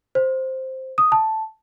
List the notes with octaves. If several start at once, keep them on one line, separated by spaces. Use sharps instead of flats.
C5
D#6
A5